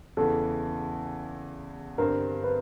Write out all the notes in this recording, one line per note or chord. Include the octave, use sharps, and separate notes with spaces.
E2 C#3 E3 A4
G2 D3 G3 C4 A#4
B4